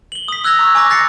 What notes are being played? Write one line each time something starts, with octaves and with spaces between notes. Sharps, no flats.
F#7 G7
D#6 B6
D#6 E6 F#6 G#6 A#6 F7
A#5 C#6
G#5 C#6 D6 A#6
F#6 A6 A#6 C7 C#7